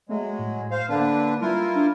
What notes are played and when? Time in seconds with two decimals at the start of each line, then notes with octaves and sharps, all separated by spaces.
0.09 F#3 G#3 A3
0.39 A2
0.71 C5 F5
0.89 D3 A#3 D4 B4
1.41 G3 E4 F4 A#4
1.75 D4